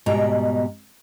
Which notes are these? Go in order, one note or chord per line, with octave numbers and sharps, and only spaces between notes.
G#2 B2 G3 A#5